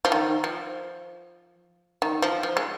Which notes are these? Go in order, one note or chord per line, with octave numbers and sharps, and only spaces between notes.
F3
D#3
F3
D#3
F3
F3
G#3